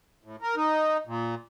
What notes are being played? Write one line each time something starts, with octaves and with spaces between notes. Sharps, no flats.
A2
A#4
D#4
A#2